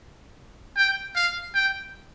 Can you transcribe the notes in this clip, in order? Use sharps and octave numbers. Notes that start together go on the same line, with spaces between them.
G5
F5
G5